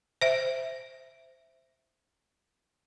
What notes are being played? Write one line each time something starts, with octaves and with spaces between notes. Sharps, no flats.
C5 E5